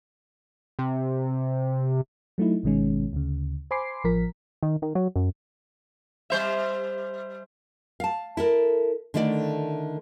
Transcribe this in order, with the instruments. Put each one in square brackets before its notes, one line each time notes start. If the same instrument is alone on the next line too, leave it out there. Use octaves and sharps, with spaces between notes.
[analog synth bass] C3
[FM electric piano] F#3 A3 D#4 E4
G#1 B2 D#3 G#3 C#4
D2 C#3
C5 G#5 B5 C6 D6 C7
A1 F3 A#4 B6
[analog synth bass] D#3
D#3
F#3
F#2
[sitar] G3 C5 E5
[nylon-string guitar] F5 A5
E4 A4 A#4
D3 D#3 A3 E4 D5